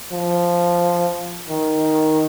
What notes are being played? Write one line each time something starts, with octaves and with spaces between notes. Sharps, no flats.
F3
D#3